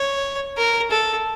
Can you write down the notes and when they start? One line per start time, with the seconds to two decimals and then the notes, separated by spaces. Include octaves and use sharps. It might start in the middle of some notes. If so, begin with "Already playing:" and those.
Already playing: C#5
0.57 A#4
0.91 A4